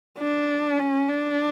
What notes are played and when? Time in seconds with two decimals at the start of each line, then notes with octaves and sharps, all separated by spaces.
0.19 D4
0.79 C#4
1.09 D4